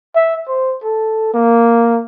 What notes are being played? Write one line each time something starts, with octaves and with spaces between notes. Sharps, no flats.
E5
C5
A4
A#3